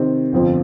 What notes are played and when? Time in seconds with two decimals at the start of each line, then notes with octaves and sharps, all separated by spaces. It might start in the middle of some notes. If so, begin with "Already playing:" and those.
Already playing: C3 D#3 C4
0.32 G1 F2 F3 C4